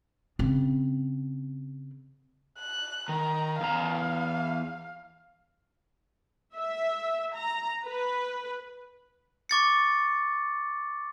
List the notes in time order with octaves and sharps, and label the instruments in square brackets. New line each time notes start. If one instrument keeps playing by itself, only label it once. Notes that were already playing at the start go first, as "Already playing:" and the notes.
[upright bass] C#3 C4
[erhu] F#6
[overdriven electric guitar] D#3 [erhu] A#5
[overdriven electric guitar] E2 A#5 [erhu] F5
[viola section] E5
A#5
B4
[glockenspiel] C#6 D6 A6 C#7